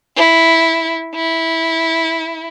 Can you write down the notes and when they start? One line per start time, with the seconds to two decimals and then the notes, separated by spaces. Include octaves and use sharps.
0.16 E4
1.15 E4